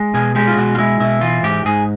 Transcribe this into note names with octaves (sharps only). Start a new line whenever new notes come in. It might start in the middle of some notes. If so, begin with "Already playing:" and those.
Already playing: G#3
B2 G#4
G#3 G4
F4
B2 F#4
F4
G#3 E4
B2 E4
E3 F4
G#2 G4
G#2 G#4